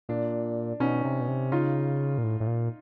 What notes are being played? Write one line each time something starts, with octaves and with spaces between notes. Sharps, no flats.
A#2 D4
B2 C#4 D#4
C3
B2
C3
C#3 D#4 F4
A#2
A2
A2
A#2